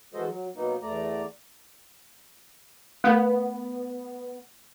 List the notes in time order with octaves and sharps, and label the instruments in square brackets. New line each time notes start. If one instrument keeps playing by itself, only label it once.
[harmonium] E3 G#3 F#4 A4 C5 D#5
F#3
B2 F#3 A#3 B3 D#4
E2 A3 D5 A#5
[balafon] A3 A#4 [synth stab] B3